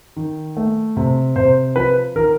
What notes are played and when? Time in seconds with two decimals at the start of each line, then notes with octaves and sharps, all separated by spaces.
0.16 D#3
0.57 A3
0.97 C3
1.36 C3 C5
1.76 F3 B4
2.16 D#3 A#4